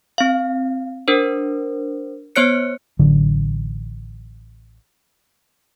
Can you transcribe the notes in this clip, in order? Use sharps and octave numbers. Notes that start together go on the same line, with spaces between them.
C4 F5
D4 A#4 C5
B3 C5 C#5 F#6 C#7
A1 D3 F#3